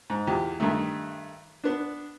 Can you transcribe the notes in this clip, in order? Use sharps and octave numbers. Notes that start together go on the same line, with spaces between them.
G#2
E2 A#2 G4
G2 D#3 A3
B3 D4